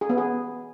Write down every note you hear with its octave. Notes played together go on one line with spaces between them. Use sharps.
G#4
B3
G#4